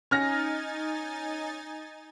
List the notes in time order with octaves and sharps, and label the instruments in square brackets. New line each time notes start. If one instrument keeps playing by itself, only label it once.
[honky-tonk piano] C#4 F6 A#6 [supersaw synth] D#4 G#5 A6